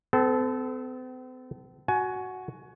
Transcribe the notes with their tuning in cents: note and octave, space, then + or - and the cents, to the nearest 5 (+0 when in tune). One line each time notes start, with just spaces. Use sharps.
C4 -45 A4 -15
F#4 +0 G#5 +25